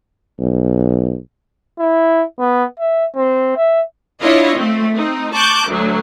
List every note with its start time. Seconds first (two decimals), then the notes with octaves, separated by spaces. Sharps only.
0.40 B1
1.79 E4
2.39 B3
2.79 E5
3.16 C4
3.57 E5
4.22 D4 E4 F4 C#5 D#5
4.58 A3 C4
4.95 C4 D#4
5.34 A5 C#6 D6 F#6 G6
5.68 D2 F#3